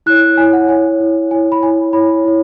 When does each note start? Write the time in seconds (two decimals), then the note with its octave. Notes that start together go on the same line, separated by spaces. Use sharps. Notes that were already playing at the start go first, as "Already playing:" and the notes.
0.06 E4 C#5 F#6
0.37 E4 C#5 G#5
0.53 F#5
0.68 E4 C#5 G#5
1.00 E4 C#5
1.31 E4 C#5 G#5
1.52 B5
1.63 E4 C#5 G#5
1.93 E4 C#5 B5
2.24 E4 C#5